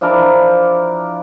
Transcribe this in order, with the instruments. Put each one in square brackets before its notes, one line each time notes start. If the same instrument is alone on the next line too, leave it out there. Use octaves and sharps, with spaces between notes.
[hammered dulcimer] F3 D4 E4 A#4